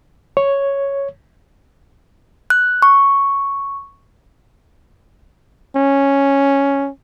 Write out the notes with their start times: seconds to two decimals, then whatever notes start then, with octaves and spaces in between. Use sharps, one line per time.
0.37 C#5
2.50 F#6
2.82 C#6
5.76 C#4